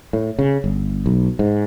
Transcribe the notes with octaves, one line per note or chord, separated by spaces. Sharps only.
A2
C#3
G1
B1
G#2